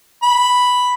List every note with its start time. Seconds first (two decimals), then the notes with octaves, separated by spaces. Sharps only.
0.23 B5